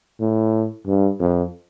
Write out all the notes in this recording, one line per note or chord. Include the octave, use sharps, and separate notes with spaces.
A2
G2
F2